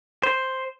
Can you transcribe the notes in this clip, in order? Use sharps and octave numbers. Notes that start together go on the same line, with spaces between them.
C5